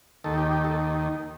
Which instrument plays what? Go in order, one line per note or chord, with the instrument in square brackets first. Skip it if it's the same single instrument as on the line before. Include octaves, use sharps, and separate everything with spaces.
[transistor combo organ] D#2 D#3 A4
G4
G4
A4